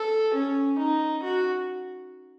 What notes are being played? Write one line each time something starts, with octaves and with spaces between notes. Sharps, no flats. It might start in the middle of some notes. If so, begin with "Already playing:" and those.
Already playing: A4
C#4
D#4
F#4